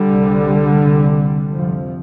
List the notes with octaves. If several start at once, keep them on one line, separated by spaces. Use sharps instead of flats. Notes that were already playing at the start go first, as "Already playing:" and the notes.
Already playing: D3 G3
C2 C3
C2 C3
F2 C3 F3